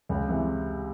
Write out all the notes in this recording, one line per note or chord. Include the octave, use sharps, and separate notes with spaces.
C#2
C3 E3